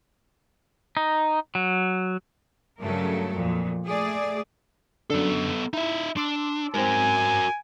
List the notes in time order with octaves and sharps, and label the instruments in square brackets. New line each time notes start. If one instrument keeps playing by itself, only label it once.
[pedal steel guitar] D#4
F#3
[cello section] G2 C#3 F#3 A3 A4 A#4
F2 A#2
A3 G#4 D5
[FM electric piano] F#2 D3 [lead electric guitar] B3 A4
[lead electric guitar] D#4 E5 [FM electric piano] E4
[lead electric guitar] D4 [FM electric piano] C6 D6 E6
[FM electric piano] G#2 C4 [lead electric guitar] F#4 A#4 [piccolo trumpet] G#5